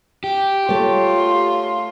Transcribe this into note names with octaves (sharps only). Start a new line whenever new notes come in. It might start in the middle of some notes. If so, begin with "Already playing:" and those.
G4
A3 F4 C#5